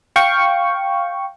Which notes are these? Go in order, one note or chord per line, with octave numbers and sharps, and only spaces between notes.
F5 G5 C#6